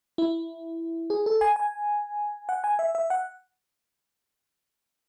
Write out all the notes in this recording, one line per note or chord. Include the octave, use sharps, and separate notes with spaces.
E4
G#4
A4
G#5
G#5
F#5
G#5
E5
E5
F#5